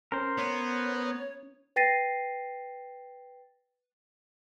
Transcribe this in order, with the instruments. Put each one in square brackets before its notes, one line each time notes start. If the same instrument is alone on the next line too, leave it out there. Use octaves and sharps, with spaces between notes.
[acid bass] C#4 [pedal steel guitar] A#4 C5
[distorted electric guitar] B3 [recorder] C#5
[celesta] B4 G5 A6 A#6 C7 D#7